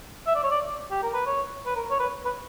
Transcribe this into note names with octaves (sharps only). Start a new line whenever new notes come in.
E5
D5
C#5
D5
G4
A#4
B4
C#5
B4
A#4
C#5
B4
B4